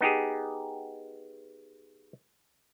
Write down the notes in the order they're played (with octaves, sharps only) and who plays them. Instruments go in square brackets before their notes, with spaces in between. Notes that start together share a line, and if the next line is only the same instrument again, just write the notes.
[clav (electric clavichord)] B3 D#4 G4 G#4